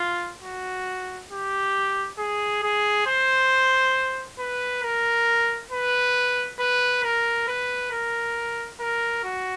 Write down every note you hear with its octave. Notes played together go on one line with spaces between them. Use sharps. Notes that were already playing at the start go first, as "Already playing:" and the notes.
Already playing: F4
F#4
G4
G#4
G#4
C5
B4
A#4
B4
B4
A#4
B4
A#4
A#4
F#4